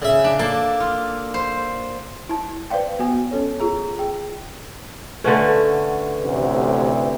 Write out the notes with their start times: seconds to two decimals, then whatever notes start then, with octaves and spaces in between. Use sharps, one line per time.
0.02 C#3 E5
0.24 D4
0.39 A#3 A4
0.80 F4
1.34 C5
2.29 E4 A5
2.70 B4 C5 D5 F5 G5
2.99 B3 F#4 G#5
3.31 C#4 A4 C#5
3.60 F4 G#4 A#5
3.99 G#4 G5
5.24 D3 A3 C#4 A4 B4 F#5
6.22 A1 D2 C3